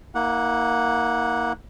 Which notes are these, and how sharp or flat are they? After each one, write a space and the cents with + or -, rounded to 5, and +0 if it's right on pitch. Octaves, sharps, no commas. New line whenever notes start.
A#3 +0 E4 -45 F#5 -10